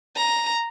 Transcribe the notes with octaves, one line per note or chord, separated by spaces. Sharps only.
A#5